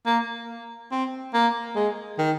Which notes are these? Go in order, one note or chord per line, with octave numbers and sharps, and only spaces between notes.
A#3
C4
A#3
G#3
D#3